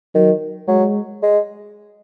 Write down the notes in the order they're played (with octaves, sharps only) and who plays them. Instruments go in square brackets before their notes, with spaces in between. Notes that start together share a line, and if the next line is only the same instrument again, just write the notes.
[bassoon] D#3 [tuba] F#3
[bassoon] F#3 [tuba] G#3
[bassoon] G#3